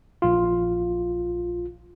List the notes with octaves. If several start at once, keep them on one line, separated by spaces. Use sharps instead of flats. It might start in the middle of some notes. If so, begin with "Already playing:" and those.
A#1 F4